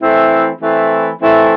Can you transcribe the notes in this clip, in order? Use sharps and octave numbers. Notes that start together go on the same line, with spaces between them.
E3 A3 C4 E4
E3 A3 C4 E4
E3 A3 C4 E4